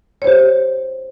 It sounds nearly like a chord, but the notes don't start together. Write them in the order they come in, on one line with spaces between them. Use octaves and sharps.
C#5 C5 G4